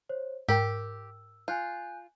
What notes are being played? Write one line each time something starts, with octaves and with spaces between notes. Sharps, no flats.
C5 C#5
G#2 G4 A#4 G5 E6
F4 G#5 F#6 G6